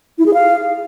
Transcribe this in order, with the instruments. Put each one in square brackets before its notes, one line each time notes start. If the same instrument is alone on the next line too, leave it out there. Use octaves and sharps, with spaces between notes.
[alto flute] E4
G#4
F5